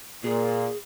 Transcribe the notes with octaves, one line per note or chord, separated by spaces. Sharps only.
A#2 G#4